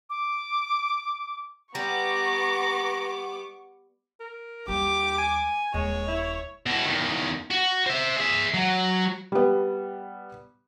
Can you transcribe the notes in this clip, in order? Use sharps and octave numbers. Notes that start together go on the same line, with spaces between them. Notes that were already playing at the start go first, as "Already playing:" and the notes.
D6
G3 B3 A#5 C#6 D6
A#4
D#2 G3 G4 D6
G#5
D#1 G#3 C#5
E4
B2 E4
E2 D#3
F#4
C5 E5
G#4 E5
F#3
G3 B3